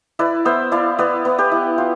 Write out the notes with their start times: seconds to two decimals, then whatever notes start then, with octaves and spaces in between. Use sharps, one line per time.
0.19 E4 B4 D5
0.45 B3 C5 E5
0.72 E4 D5 F5
0.99 B3 B4 D5
1.25 B3
1.38 G4 B4
1.52 E4
1.78 F4